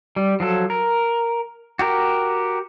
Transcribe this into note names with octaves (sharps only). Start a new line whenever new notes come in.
G3
F3 F#3 A4
A#4
F#4 G4 A#4